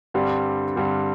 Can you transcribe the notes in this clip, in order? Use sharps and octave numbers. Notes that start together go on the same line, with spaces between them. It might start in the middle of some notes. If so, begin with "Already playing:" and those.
G2 D3 G3 C4
G2 D3 G3 C4